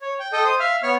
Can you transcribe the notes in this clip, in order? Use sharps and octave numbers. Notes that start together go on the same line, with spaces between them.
C#5
G5
A4 D#5 G5
C5 D#6
E5 F5 F6
B3 C#5 C#6 F6